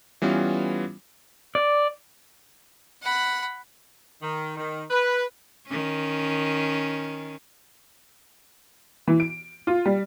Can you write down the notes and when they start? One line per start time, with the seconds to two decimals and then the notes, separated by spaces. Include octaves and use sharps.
0.22 E3 G3 B3 C#4 F4
1.55 D5
3.02 F#5 B5
4.21 D#3
4.57 D#3
4.90 B4
5.67 D#3 C#4
9.08 E3
9.20 D7
9.67 F4
9.86 G3